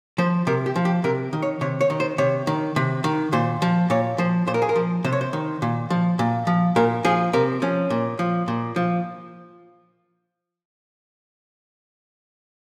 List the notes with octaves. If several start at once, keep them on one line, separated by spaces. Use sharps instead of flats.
F3 C5
C3 A#4
G4
F3
G4
C3 A#4
D#3
C#5
C3 C#5
C#5
D#3
C5
C3 C#5
D#3
C3
D#3
A#2 C5
F3
A#2 C#5
F3 C5
A#2 C5
A#4
G#4
A#4
F3
C3 C5
C#5
C5
D#3
A#2
F3
A#2
F3
A#2 A#4
F3 G#4
C3 A#4
F3 C#4
A#2
F3
A#2
F3